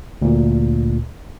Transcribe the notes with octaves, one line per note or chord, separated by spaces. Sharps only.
D2 A#2